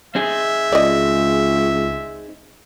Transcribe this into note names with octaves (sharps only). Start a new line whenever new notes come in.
C4 D#4 G#4 E5
C#2 D5 D#5